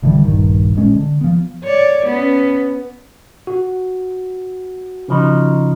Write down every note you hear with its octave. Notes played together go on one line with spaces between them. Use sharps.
E1 D3 E3 G3
D#1 A#1 G2 D#3
A1 A#2 G#3 C#4
D3
F3 B3
C#5 D5
B3 C#4
F#4
C#3 F3 D#4